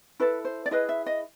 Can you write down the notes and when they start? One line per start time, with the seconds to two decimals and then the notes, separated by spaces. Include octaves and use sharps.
0.20 E4 A4 B4
0.45 C5
0.66 D5
0.71 E4 G#4 B4 D#5
0.89 E5
1.06 D#5